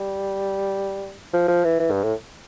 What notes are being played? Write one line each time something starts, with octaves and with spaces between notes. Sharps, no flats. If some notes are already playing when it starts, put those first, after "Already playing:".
Already playing: G3
F3
F3
E3
E3
G2
A2